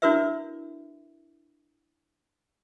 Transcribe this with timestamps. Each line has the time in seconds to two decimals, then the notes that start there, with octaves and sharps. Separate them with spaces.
0.02 D4 E4 F#4 A#4 B4 E5